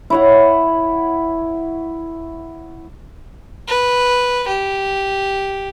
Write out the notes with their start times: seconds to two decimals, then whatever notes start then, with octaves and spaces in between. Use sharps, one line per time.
0.10 E4 C#5 F#5
3.68 B4
4.48 G4